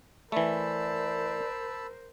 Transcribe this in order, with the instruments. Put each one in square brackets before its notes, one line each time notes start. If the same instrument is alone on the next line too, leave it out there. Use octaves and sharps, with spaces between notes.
[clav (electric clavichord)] E3 A3 [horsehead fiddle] A#4 C5 [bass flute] D5 [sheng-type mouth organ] A5 B5 E6